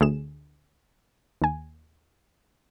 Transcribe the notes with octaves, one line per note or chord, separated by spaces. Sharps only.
D2 G#4 E7
D#2 G#5